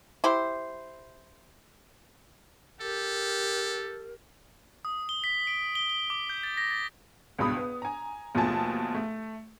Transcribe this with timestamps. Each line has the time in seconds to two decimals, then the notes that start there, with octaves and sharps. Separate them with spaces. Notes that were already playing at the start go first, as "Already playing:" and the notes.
0.24 E4 G4 C5
2.81 G4 A4 A#4
4.85 D#6
5.09 G7
5.24 B6
5.47 D7
5.75 G7
5.90 G7
6.10 D6
6.30 G6
6.43 A6
6.57 A#6
6.70 A6
7.39 C#2 G2 B2 B5 D#6
7.57 B3
7.82 G#5 A#5
8.35 D#2 B2 F3 A3 G#5 A5
8.95 A3